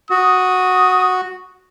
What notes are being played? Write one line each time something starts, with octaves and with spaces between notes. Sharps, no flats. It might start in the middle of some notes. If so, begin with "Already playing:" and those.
F#4 D#6